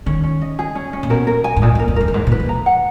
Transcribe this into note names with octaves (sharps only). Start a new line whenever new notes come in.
D#3 C#4
C#4
D#5
G#4
C#4
C#4
A#2
B2 A#4
A#4
G#5
G#2
A#2 D#5
F#2
A#4
F2
F#2 A#4
F#2
G#2 B4
A#2
B4
F3
A#5
F#5